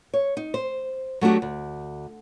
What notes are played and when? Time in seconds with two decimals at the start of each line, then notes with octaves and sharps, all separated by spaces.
0.14 C#5
0.37 D#4
0.54 C5
1.21 F#3 A3 D4 F#4 G4
1.42 D2